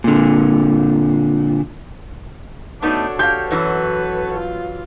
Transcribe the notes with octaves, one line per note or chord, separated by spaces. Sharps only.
A#2 D3
A3 B3 D4 D#4 F#4 A4 C#5
G4 F5 G6
F#2 E3 F#3 B4
F4